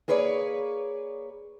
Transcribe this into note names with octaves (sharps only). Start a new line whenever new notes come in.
A#3 G#4 B4 C#5 D5